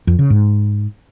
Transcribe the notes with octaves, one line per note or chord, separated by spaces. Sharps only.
F2
C#3
G#2